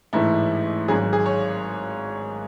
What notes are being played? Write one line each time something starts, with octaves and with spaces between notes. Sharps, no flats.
A1 G#2 E3 A3 E4
G#1 G#2 F#3 G#4
G#4
C#5